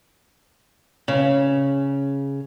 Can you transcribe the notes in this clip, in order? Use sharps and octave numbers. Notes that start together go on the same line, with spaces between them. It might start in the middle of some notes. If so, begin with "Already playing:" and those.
C#3